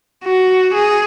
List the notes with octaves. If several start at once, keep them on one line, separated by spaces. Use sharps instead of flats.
F#4
G#4